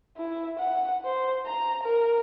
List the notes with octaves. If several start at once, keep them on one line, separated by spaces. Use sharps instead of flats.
E4
F#5
C5
A#5
A#4